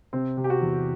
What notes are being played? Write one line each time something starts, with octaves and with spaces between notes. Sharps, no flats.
C3 C4
C3
G4
F#4
E2